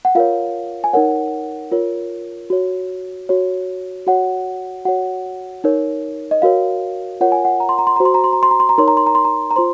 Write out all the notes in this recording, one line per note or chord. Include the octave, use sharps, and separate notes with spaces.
F#5
F4 A#4 C#5 F5
G#5
D#4 A#4 C#5 F#5
F4 A#4 C#5
F#4 C#5
F#4 C#5
F#4 C#5 F#5
F#4 C#5 F#5
D#4 A#4 C#5
D#5
F#4 A#4 C#5 F5
F4 A#4 C#5 F#5
G#5
F#5
A#5
C6
A#5
C6
F#4 C5 A#5
C6
A#5
C6
A#5
C6
A#5
C6
A#5
D#4 A#4 C#5 C6
A#5
C6
A#5
C6
A#5
A#5
F4 C5 C6